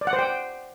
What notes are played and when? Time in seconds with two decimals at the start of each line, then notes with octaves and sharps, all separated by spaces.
0.01 D5
0.07 F#5
0.13 C5
0.19 G5